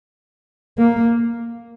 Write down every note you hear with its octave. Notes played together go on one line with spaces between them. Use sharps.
A#3